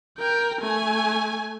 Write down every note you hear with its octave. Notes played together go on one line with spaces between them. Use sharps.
A#4 G5
A3 G#5